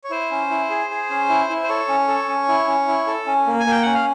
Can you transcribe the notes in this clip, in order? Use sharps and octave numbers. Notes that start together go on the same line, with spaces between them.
C#5
E4 C5
C#4
E4
G#4
G#4
C#4
E4
E4
C5
A4 C#5
C#4
A4
C#4
E4
C#4
E4
A4
C#4
A#3
G#5
A#3 G5
C#4 F#5
F5